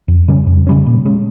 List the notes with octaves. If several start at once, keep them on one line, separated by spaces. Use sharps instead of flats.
F2
C#3 G3 C#4
F2
C#3 G3 C#4
A#2
G#3 C#4